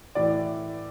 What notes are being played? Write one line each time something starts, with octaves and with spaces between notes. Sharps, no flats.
A2 E3 D5